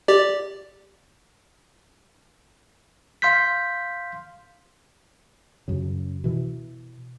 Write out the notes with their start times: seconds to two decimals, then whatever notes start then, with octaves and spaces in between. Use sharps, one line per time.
0.08 G4 D5
3.22 F5 C6 G6 B6
5.68 F#2 C#3
6.24 B2 E3